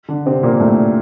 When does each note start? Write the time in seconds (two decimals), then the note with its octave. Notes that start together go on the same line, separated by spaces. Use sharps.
0.09 D3 D4
0.26 C3 C4
0.43 A#2 A#3
0.60 A2 A3